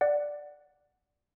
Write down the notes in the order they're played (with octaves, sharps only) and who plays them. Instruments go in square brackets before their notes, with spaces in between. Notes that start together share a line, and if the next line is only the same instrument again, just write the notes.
[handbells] D5 F#5